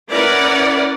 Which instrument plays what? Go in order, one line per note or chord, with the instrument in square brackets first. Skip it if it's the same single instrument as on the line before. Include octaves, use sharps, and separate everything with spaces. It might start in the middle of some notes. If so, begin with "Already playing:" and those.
[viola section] C#4 E4 A#4 B4 D5 F#5